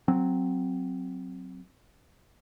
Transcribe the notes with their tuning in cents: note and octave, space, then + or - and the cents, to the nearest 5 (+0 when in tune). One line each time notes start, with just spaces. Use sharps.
F#3 +0 C4 +0